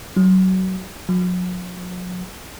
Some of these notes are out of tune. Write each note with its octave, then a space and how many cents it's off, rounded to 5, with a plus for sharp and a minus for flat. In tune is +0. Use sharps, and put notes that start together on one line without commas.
F#3 +20
F#3 -40